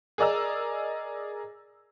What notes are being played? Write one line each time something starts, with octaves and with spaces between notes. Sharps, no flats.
G#4 A#4 D5 D#5 A#5 E6